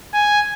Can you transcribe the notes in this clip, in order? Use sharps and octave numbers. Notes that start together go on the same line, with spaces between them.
G#5